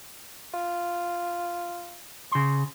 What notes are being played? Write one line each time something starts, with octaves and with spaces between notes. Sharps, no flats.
F4
C#3 C6